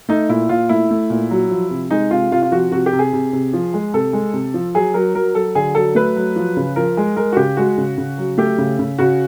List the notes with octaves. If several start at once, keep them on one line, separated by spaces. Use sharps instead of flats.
A3 D#4
A#2 E4
A#2 F4
A3 E4
A3
A#2
F#3
F3
C3
G#3 D#4
C3 F4
C3 F4
F4
F3 F#4
C3 F#4
G4
C3
G#4
C3
C3
F3
G#3
C3 A4
G#3
C3
F3
F#3 G#4
F#3 A#4
F#3 A#4
F#3 A4
D3 G#4
F#3 A4
A3 B4
F#3
F3
C#3
F3 A#4
G#3
G#3 A#4
F#4
C#3 G4
G#3 F#4
C#3
C#3
F#3
A3 G4
C#3
C#3
C#3 F#4